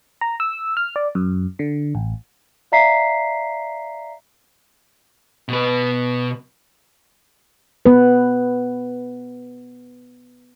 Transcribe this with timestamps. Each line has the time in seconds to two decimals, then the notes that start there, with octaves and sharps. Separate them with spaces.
0.21 A#5
0.40 E6
0.77 F6
0.96 D5
1.15 F#2
1.59 D3
1.95 A1
2.72 D5 E5 F5 A#5 B6 C7
5.48 B2 B4
7.86 B3 B4